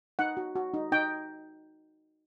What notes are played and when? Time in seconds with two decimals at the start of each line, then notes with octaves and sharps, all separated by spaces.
0.19 D#4 F#5
0.37 F#4
0.56 F#4
0.74 D#4
0.92 D#4 G5